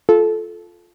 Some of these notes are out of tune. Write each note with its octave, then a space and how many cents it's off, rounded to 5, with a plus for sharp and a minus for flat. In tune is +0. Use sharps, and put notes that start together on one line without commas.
F4 +0 A4 -15